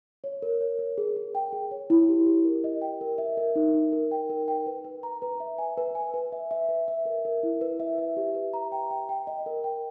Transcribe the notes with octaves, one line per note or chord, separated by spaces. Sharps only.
C#5
A#4
C#5
A#4
G#4
G#4
G5
G#4
C#5
E4
G4
G4
A#4
D#5
G5
A#4
E5
A#4
D#4
D#4
A#4
G5
A#4
G5
B4
B4
A#5
B4
E5
G#5
B4
G#5
B4
E5
E5
B4
E5
A#4
A#4
E4
B4
E5
E5
G4
B4
A#5
G5
G5
G5
D#5
A#4
G5